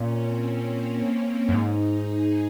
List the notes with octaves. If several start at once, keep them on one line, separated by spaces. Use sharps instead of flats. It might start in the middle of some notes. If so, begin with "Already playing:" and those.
Already playing: A#2 C#4
C4
C#4
A#3
F#2
G#2 D#4
G#4